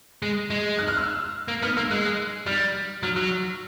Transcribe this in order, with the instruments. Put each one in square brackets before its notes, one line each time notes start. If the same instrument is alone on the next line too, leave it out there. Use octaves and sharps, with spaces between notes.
[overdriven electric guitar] G#3
G#3
[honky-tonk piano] F#6
F6
E6
[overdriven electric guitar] A#3
[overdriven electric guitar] B3 [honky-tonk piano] F6
[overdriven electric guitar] A#3 [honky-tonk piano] E6
[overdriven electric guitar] G#3 [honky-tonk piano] F#6
[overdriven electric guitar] G3 [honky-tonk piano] F6
[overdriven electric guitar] F#3 [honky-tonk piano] F6
[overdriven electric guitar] F#3 [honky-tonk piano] E6